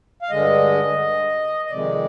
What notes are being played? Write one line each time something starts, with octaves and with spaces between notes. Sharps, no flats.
F5
G2 D3 G#3 D#5
D#5
F2 C3 D#3 G#3 D5